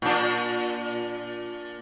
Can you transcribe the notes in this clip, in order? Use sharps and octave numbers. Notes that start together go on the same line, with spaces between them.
A#2 D4